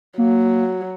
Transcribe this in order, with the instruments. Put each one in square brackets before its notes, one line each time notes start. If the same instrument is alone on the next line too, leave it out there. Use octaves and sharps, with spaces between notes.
[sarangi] F#3 [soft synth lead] A#3